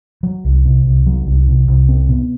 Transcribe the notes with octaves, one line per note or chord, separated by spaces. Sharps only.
F#3
C2
C3
C2
F#3
C2
C3
C2
C4
B2